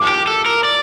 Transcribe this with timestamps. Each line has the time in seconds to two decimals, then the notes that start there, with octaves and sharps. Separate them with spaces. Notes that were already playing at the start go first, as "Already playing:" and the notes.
Already playing: D6
0.08 G4
0.27 A4
0.46 A#4
0.65 D5